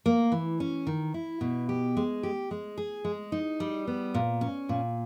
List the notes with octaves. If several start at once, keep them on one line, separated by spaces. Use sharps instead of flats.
A#3
E3
C#4
D#3
E4
B2
G4
G#3
G4
G#3
G#4
G#3
D#4
G3
B3
A#2
C#4
A#2